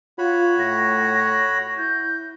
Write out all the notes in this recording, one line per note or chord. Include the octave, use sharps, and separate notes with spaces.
F4 F#4 C#5 B5
A2 A#6
E4 G6